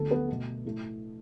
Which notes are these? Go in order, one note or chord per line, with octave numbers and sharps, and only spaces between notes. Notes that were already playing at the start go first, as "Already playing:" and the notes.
Already playing: D2 D3 B3 A4
B3 B4
B2 A3
A2 A3